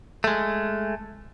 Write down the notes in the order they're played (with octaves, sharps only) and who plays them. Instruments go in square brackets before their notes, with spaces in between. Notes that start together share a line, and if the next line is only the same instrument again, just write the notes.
[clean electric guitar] G#3 A3